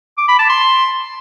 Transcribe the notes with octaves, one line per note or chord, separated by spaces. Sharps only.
D6
B5
A5
C6